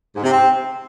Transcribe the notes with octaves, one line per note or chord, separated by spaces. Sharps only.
G#2
C3
C4